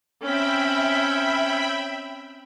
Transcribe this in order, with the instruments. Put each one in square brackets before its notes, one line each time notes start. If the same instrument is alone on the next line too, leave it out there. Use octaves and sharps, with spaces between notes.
[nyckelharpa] C4 C#4 [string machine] E5 G5 B5